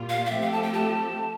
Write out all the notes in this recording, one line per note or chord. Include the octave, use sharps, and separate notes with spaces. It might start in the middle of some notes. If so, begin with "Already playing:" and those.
Already playing: A#2 G3 A#3 F4
F5
F5
F3 A3 C4 G4 E5
F5
A5
G5
A5